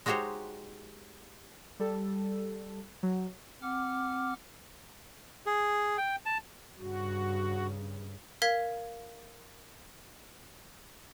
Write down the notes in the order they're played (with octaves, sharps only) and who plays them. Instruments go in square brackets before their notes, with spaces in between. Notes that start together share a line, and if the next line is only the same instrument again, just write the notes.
[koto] G#3 D#4 F#4 G4 C5 C#5
[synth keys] G3 A4
F#3
[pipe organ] C4 F#5 D6 F6
[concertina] G#4
G5
A5
[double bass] G2 C#3 [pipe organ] F#4
[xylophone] A#4 F5 G#6 B6